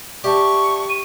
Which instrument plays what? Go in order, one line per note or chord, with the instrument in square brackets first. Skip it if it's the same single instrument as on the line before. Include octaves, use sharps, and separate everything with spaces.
[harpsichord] G4 [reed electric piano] D5 E5 A5 [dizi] C#6
[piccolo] D#7